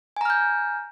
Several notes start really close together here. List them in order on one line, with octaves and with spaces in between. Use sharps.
G#5 A#5 F6 G6